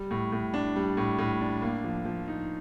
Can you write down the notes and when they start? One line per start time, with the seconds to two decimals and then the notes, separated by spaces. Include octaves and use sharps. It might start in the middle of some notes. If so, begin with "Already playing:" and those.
Already playing: G3
0.11 A2
0.32 A2
0.54 D4
0.76 G3
0.97 A2
1.18 A2
1.41 D4
1.62 A#3
1.84 F3
2.05 F3
2.28 D#4